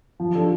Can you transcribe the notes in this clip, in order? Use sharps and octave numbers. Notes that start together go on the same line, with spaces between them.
F3
D4 A4